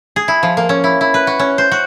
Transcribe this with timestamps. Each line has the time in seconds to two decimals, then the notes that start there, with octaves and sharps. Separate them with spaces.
0.16 G#4
0.28 E4
0.43 F3
0.57 A#3
0.69 C#4
0.84 E4
1.01 E4
1.14 B4
1.27 F#4
1.39 C#4
1.58 C5
1.72 F#4